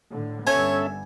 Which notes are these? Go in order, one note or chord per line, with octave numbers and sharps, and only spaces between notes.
A2 D3
G1 G3 B3 C#4 A4 C#5 E5 G#5